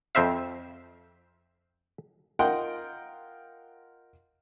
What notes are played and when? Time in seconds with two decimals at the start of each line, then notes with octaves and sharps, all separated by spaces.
0.15 F2 C4 C5 E5 F5
2.39 F4 A#4 D#5 F#5 G5 C6